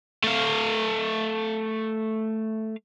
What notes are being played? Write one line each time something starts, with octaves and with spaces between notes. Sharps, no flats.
A3 F5